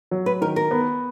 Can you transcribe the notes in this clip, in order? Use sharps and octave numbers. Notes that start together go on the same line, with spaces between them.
F#3
B4
D#3 A#4
A#4
B3